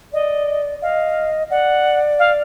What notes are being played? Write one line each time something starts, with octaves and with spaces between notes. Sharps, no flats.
D5 D#5
D#5 F5
D5 F#5
F5